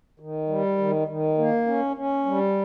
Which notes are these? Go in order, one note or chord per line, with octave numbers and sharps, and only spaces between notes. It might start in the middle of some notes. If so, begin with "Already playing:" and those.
D#3
G3
D#3
D#3
A#3
C#4
C#4
G3